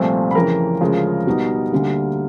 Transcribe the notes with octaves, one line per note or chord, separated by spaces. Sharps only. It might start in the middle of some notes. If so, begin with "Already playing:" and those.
Already playing: C2 A#2 F3 A3 C4
B5
F2 C#3 E3 A#4 A#5
D2 C#3 F3 G#3
B2 G3 B3 D#4
D2 D3 G3 A#3